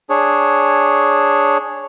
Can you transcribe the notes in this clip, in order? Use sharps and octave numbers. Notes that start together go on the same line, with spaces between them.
D4 G#4 C#5